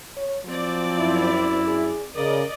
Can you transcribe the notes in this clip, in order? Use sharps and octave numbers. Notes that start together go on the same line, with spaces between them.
C#5
F3 F#3 C4 D5
F#2 E4
G#4
C#3 A#4 D5 D#5